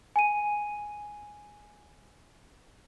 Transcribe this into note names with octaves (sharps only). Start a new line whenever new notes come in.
G#5 D#7